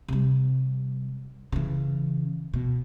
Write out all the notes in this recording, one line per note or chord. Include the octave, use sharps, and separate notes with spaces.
C3 G3
C#3 E3
B2